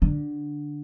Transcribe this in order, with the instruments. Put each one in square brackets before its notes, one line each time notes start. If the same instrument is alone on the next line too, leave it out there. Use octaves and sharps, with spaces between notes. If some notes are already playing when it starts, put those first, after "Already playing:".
[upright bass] D3